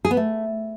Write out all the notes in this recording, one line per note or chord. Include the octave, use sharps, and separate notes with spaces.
G#4
B3
A3